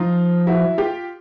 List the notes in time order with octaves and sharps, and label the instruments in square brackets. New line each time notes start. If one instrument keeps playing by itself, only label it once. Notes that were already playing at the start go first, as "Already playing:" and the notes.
Already playing: [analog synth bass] F3 [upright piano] D#4 F4
[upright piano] E4 F#4
F4 G4